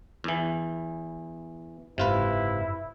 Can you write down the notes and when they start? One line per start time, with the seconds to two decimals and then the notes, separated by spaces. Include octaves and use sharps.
0.24 E2 E3
1.98 F#1 G#2 C3 E4 F4 B4